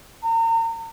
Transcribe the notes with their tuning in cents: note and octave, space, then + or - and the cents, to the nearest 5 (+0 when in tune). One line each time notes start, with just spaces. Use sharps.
A#5 -40